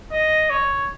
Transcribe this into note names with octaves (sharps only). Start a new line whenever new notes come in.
D#5
C#5